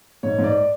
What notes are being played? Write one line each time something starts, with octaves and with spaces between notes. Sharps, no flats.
G#2 C#5
G#2
D5